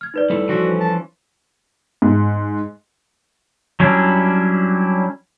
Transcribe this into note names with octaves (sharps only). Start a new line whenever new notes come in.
F6 G#6
D#4 B4 D5
G3 E4 A4
E3 F3 C#4 F#4
A5
G#2
F#3 G3 C#4 D4 E4